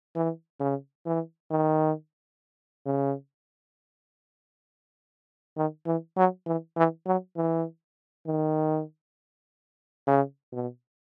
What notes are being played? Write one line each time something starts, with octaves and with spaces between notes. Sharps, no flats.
E3
C#3
E3
D#3
C#3
D#3
E3
F#3
E3
E3
F#3
E3
D#3
C#3
B2